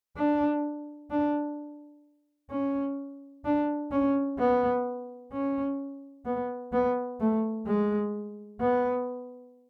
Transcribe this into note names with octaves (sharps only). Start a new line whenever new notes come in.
D4
D4
C#4
D4
C#4
B3
C#4
B3
B3
A3
G#3
B3